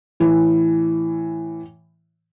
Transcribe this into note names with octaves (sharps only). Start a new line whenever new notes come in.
A2 E3